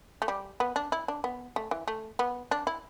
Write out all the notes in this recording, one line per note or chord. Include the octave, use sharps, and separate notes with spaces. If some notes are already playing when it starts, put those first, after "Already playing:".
A3
G3
B3
D4
E4
D4
B3
A3
E3
A3
B3
D4
E4